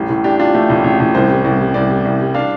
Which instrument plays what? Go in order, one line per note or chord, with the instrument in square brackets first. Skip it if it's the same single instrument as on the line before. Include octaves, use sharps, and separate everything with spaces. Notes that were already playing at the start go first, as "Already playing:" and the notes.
Already playing: [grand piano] A1 G3
A2
D4 G4
D4 F4
A3 G4
A1
A1
A1
C2 C5
G3
C2
G3
C2 D5
G3
C2
G3
D4 F5